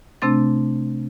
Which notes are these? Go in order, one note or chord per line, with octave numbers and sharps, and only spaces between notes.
C3 A3 C4 D4 A6